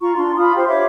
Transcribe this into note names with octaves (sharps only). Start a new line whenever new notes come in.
F4 A#5 C#6
D4 F4 C6
F4 B5 D#6
G4 C5 C6
C#5 E5 D6